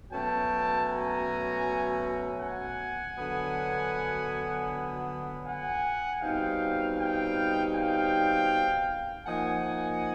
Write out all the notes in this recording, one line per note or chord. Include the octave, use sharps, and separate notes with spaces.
B2 F#3 A3 C#4 G5 A5
G#5 A#5
F#5 G#5
D3 F#3 B3
F#5 G#5
B2 G3 C4 D#4 F5 G5
F5 G5
F5 G5
F3 A#3 D#4 F#5 G#5